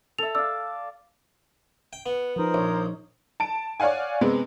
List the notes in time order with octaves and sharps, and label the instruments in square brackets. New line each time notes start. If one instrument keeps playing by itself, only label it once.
[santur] A4 E5 [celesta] F7
[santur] D5 F5 [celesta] E6
[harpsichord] G5
[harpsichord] B3 [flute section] F#5
[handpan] F3 D#4 [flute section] A#4 C5 D#6
[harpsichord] A#1 [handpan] C#5
[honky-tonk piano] A5 D7
C#5 D5 F5 F#5 G#5
C3 G#3 B3 C4